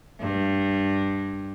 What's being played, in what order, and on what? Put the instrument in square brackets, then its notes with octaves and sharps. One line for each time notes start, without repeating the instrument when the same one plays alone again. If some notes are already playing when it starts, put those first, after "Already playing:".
[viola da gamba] G2